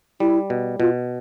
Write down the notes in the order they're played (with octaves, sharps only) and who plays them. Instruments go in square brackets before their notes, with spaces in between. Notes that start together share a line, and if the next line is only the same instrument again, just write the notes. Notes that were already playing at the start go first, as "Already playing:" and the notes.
[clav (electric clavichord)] G3 [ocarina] E4
[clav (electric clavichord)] B2
[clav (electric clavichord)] B2 [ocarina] F4